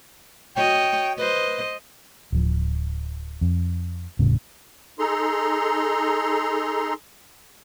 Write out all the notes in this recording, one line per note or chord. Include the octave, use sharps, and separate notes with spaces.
F#4 C#5 D#5 G5
B4 C5 D#5
D1 F3
F2
E1 A2 C#3 G3
D#4 G#4 A4 A#5 C6